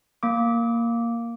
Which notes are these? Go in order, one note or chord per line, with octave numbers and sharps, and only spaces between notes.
A#3 D6